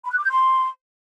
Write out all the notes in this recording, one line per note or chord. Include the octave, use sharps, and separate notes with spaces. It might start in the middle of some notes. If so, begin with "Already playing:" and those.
B5
F#6
D6
G6
C6